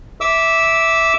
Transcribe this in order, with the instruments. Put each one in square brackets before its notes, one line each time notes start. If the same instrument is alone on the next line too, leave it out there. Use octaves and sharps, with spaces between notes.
[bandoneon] E5 D6 E6